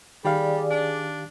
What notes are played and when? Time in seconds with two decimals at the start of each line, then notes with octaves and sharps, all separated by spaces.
0.25 D#3 G3 G4 G#4 D5 F5
0.70 D4